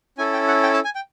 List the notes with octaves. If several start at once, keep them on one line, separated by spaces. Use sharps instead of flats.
C#4 E4 A4 G#5
G5
F#5
G5
A5
G#5
G5